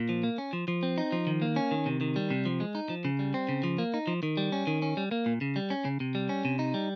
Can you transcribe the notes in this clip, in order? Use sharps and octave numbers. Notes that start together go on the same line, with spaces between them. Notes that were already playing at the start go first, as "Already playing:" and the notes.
Already playing: A#2
F3
A#3
C#4
F3
F3
C4
D#4
F3
D#3
A#3
C#4
D#3
C3
D#3
G3
C3
F3
G#3
D#4
F3
C#3
G3
C4
C#3
F3
A#3
D#4
F3
D#3
G3
C#4
D#3
C#4
G3
A#3
A#2
C#3
G3
C#4
C#3
C3
G3
C#4
C3
D#4
G3